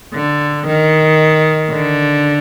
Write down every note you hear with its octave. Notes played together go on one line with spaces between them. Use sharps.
D3
D#3
D3